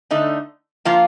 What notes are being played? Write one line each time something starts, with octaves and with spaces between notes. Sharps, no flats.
D3 A3 D#4
F3 A#3 F4